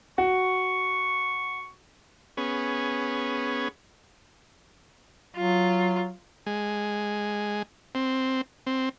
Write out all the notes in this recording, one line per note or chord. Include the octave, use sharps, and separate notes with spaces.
F#4 C#6
B3 C#4 G#4
F#3 F4
G#3
C4
C4